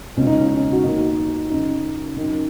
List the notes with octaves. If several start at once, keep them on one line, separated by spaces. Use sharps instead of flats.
C#2 B2 C#4
D#4
C#4
D#4
C#4
F#4
D#2 D#3 D#4
F#2 C#3 D#4
F#2 D#3